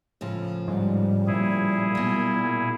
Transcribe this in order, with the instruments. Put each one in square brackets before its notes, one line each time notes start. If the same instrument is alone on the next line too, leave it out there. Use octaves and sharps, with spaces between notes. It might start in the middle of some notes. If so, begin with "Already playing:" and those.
[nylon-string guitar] A2 C#3 F3
[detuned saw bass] G#2 [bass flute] G3
[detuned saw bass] A#2 [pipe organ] E4 G#4
[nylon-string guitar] B2 F#3